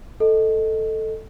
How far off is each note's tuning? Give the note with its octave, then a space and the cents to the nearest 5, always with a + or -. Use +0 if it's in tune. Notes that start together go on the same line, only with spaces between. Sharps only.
A4 +0 D#5 +0